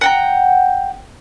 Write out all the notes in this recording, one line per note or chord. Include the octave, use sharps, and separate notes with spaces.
F#5 G5 A#5